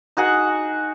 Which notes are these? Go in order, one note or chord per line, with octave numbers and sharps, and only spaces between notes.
D#4 F#4 G#4 F#5